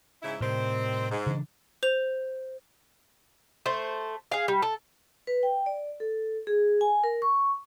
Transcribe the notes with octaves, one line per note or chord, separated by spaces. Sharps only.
G#2 C#3 E4
A2 C3 D#3 G3 C4
G#2
C#3 E3 D4
C5 F7
A3 C5
G#4 F5
G3
A4
B4
G5
D5
A4
G#4
G#5
A#4
C#6